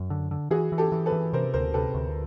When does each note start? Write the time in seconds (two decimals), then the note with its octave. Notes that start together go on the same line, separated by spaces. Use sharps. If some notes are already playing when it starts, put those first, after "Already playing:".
Already playing: F#2
0.10 D3
0.31 D3
0.51 E3 F#4 G#4
0.72 E3
0.78 G4 A4
0.92 E3
1.06 A4 B4
1.12 E3
1.33 C3 A#4 C5
1.54 D2 A#4 C5
1.74 C3 A4 B4
1.94 D2